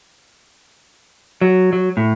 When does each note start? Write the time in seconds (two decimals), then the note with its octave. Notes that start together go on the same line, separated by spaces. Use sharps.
1.41 F#3
1.73 F#3
1.97 A2